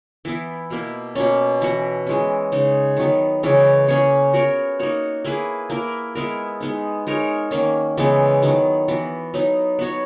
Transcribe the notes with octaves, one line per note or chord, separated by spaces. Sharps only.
E3 B3 E4
B2 A#3 E4
B2 A#3 C#4
E3 B3 F#4
E3 G#3 C#4
C#3 G#3 D#4
D#3 F#3 B3
C#3 E3 G#3 C#4
A#3 C#4 G#4 C#5
B3 F#4 A#4 C#5
A#3 D#4 F#4 C#5
A#3 E4 G#4 B4
A#3 E4 A#4
G#3 B3 E4 A#4
G#3 B3 D#4
G#3 D#4 A#4 C#5
D#3 A#3 C#4
C#3 E3 G#3 B3
D#3 F#3 B3
E3 B3 F#4
F#3 B3 D#4
B3 F#4 C#5